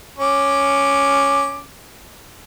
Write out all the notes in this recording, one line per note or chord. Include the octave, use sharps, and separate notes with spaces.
C#4 D6